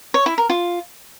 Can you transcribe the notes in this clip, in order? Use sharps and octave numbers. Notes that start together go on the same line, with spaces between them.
C#5
E4
A#4
F4